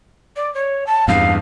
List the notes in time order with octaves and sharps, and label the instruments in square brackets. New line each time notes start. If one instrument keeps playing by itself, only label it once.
[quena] D5
C#5
A5
[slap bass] E2 G2 [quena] F5